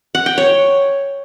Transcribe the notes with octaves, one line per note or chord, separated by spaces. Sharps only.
F#5
G5
C#5